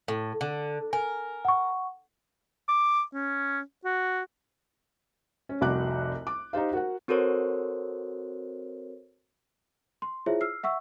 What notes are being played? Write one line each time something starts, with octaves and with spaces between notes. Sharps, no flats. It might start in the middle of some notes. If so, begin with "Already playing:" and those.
A2
D3
A#4 G#5
F#5 C#6
D6
C#4
F#4
C#4
F1 C2 F#4 D6 F#6
D6
D#4 G4 C5 F5
F#4 A#4 F#5
C4 F#4 A4 A#4 C5 C#5
C6
E4 F4 G#4 C5 C#5 E5
E6 F6 C7
E5 F#5 C#6 E6